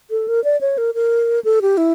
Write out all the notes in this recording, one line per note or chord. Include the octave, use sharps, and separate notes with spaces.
A4
A#4
D5
C#5
A#4
A#4
A4
G4
E4